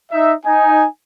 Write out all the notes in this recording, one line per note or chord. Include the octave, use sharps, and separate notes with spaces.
D#4 E5
D#4 G#5